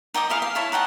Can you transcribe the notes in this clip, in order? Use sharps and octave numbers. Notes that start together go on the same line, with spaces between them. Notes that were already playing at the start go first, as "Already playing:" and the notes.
D#4 G5 D6 D#6
E4 G#4 F5
F5
E4 C#5 A5
D#4 F#5 G5 A5